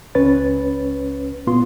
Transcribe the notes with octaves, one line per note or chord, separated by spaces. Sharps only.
C#2 C#4 B4 C#5 A6
A#2 B3 F4 C6